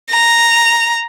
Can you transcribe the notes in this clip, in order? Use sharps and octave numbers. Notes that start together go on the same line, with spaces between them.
A#5